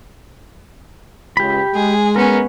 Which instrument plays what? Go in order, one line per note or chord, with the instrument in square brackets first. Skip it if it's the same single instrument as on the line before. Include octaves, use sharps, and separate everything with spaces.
[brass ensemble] C#2 [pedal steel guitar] G4 B5
[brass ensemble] G#3 [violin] G#4
[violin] B3 C#4 [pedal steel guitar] A#4